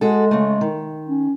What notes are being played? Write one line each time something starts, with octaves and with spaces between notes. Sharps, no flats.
G#3 F#4 G#4 A4
C#3 A3
D#3
C#4